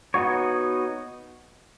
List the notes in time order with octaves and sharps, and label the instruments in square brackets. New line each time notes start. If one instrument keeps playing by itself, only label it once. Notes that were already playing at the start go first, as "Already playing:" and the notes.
[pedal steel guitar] B3 D#4 F#4 C#5